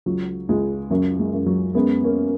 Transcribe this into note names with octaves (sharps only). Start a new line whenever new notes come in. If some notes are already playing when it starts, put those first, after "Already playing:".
C#2 F#3
C#2 G#3
F#2 F#3
G#3
F#2
F#3
F#2 G#3 B3
A#3 C#4